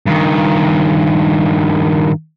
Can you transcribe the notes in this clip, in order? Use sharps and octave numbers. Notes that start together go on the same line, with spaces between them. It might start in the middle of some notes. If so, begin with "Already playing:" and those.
G2 D#3